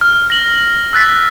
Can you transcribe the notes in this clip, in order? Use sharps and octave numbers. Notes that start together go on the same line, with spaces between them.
F6
A#6 F#7
E6 F#6 A6 B6